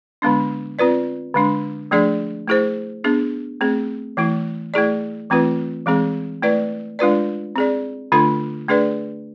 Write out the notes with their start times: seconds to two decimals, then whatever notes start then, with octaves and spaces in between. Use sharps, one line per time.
0.22 D3 G#3 B3 D4
0.79 C4 F4 B4 D5
1.34 D3 G#3 D4
1.91 F3 A3 D4 G#4 D5
2.48 A3 E4 G#4 C5
3.04 B3 D4 G#4
3.61 A3 C4 G#4
4.17 E3 A3 E4
4.74 A3 E4 G#4 D5
5.30 E3 A3 C4 F4 B4
5.86 E3 G#3 C4 G#4
6.42 A3 E4 B4 D5
6.99 G#3 D4 F4 B4 D5
7.56 C4 G#4 D5
8.12 D3 A3 D4 F4 A4
8.68 A3 D4 G#4 B4 D5